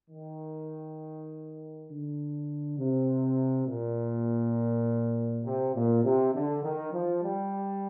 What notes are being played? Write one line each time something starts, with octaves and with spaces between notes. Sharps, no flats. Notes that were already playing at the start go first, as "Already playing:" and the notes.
D#3
D3
C3
A#2
C3
A#2
C3
D3
D#3
F3
G3